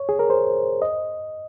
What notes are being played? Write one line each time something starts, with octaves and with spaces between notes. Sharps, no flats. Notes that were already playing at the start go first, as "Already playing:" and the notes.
Already playing: C#5
G#4
A#4
C5
D#5